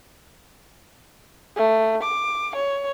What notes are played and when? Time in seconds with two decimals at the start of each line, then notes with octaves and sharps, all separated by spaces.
1.57 A3
2.04 D6
2.56 C#5